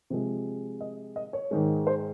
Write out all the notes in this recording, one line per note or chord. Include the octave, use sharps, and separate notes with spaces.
C3 F3 G#3
D#5
D#5
C#5
G#2 D#3 G#3
C5